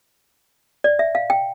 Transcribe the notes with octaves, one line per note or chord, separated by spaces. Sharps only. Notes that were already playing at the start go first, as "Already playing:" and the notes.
D5
E5
F5
G5